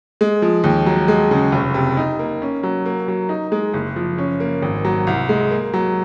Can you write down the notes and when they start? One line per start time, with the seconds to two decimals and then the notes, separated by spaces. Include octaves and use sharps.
0.21 G#3
0.42 F3
0.64 D#2
0.86 F#3
1.08 G#3
1.31 C#3
1.52 F1
1.74 C3
1.97 D#4
2.19 A#3
2.42 C#4
2.63 F#3
2.86 A#3
3.08 F#3
3.29 D#4
3.52 G#3
3.73 F#1
3.96 F3
4.18 C#4
4.40 A#3
4.62 G#1
4.85 F#3
5.07 C2
5.29 G#3
5.51 A#3
5.73 F#3